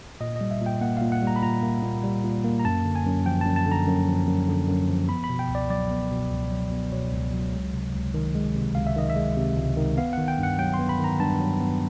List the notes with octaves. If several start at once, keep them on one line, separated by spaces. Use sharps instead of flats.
A#2 D#5
D#5
G3
E5
A#2
G5
A#3 F#5
A#2 F5
F#5
G3 A#5
B5
A#2 A#5
A#3
A#2
G3
A#2
A#3
A#5
F#2 A5
D3
G#5
F#2
F3 G5
F#2 A5
A5
D3
A#5
F#2
F3
F#2
D3
F#2
F3
B3 B5
B5
B2
G5
C#2
D5
F#3 D5
B3
B2
C#2
F#3
B3
B2 C#5
C#2
F#3
G#3
C3
C#2
D#3
G#3
C3
C#2 F5
E5
D#3 D#5
E5
G#3
C3
C#2
D#3
B3 F5
D#3 F#5
G5
G2
F#5
F#3 G5
C6
B3
B5
D#3 A#5
G2 A5
F#3
B3